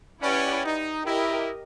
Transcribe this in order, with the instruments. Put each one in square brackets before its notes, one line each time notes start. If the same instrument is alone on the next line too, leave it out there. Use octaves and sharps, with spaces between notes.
[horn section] C#4 [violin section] E4 G4 B4 D5 F#5
[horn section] D#4
[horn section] E4 [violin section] G4 A#4 D#5